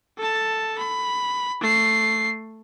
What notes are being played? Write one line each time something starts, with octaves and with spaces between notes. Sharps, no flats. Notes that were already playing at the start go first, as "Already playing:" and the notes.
A4 A5
B5
A3 C7